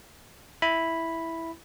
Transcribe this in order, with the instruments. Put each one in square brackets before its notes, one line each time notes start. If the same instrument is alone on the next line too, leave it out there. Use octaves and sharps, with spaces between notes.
[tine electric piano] E4 B5